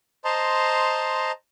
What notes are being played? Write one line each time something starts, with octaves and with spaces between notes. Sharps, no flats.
C5 D#5 A5 A#5 C6